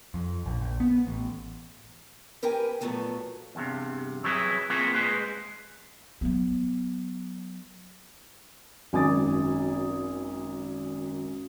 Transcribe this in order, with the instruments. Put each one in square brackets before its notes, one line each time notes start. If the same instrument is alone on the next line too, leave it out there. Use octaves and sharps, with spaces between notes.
[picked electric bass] F2
A#1
A#1
B3
A1
[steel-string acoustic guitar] G4 A#4 B4 G5 G#5
A#2 F3 F#3 A3 B3
[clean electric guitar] E2 G2 C3
F#3 C4 E4 G#4 B4
A#3 C4 F4 F#4 G#4 B4
G#3 B4 C5
[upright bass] F#3 B3
[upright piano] G#1 F#2 G#5 D6 D#6 A6